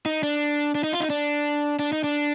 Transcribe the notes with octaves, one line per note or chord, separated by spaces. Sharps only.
D#4
D4
D4
D#4
F4
D#4
D4
D4
D#4
D4